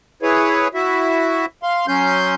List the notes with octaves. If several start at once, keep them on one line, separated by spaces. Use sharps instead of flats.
E4 G#4 B4 C#5
E4 F#4 E5
F5 C6
F#3 C#4 C6 G6